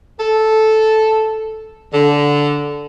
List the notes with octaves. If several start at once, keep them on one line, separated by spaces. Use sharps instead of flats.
A4
D3